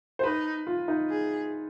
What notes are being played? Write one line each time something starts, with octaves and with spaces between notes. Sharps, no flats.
C5
D#4 B4
F4
D#4
G#4